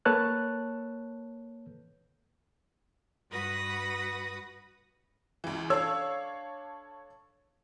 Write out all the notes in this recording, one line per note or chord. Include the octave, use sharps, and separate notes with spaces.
A#3 A4 B4 C#5 A5 F#6
G2 F#4 B4 B5 D#6 A#6
C#2 E3
D4 A4 C#5 F5 E6